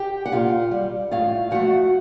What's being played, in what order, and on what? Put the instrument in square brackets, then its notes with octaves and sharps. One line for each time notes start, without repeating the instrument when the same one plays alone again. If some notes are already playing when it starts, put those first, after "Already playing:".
Already playing: [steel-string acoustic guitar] G4 G5
F#5
A#2 F4 F5
G3
A2 F4 F5
F3 A3 F#4 F#5